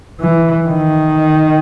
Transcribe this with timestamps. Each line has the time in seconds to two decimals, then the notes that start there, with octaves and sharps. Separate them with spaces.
0.21 E3
0.67 D#3